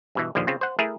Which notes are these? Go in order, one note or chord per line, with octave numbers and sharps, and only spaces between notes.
G2 B2 E3
A#1 D#2 D3 F3
C#3 C4 F4
C5 F#5
A3 E4 G#4 A#4